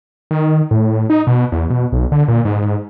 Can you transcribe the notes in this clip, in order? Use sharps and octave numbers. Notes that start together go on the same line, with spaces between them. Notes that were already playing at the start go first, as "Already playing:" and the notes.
D#3
A2
A2
D#4
B2
E2
B2
B1
D3
A#2
G#2